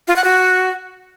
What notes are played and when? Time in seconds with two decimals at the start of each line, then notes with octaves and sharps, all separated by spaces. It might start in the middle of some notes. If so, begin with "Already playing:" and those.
0.08 F4
0.16 F#5
0.24 F#4